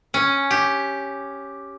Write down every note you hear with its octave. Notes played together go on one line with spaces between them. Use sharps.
C#4
G4